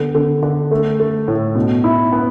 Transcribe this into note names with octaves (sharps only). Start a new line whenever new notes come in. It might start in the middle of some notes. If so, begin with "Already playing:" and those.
Already playing: D3 B3
D3
D3
A3
A3
A2
B2
E4
B3